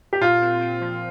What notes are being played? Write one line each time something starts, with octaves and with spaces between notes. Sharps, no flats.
G4
A#2 F4
C4
C4
F3